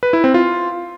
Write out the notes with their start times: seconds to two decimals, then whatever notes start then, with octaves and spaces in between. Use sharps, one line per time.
0.03 B4
0.13 E4
0.24 C4
0.34 F4